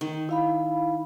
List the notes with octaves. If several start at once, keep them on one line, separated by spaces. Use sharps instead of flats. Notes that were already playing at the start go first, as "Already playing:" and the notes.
D#3
E4 F5 B5